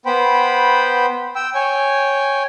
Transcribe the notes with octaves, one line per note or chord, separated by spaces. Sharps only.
B3 C5 G5 B5
G5 E6
C#5 G5 G#5